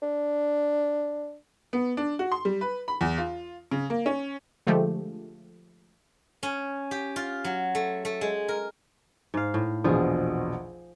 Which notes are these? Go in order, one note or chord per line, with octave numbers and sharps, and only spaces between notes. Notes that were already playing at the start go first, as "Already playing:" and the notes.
D4
B3
D4
F#4
C6
G3
B4
B5
E2
F4
C#3
A#3
C#4
D3 F3 G#3 A3 G4
C#4
G4
F4
F#3
A3
A3
G#3
A#4
G#2 F5
A2
A#1 E2 B2 F3 G#4